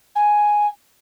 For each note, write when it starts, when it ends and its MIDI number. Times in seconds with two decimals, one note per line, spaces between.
0.15 0.67 80